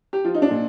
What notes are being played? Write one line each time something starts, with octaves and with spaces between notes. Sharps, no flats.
G4
F3 F4
D#4
D4
A#2